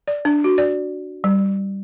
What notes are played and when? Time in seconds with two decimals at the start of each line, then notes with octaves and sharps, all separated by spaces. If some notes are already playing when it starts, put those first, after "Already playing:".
0.08 D5
0.25 D4
0.44 F#4
0.58 D5
1.24 G3